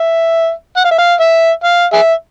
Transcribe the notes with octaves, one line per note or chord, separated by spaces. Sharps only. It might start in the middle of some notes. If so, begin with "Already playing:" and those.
Already playing: E5
F#5
F5
E5
F5
E5
F5
G#4 E5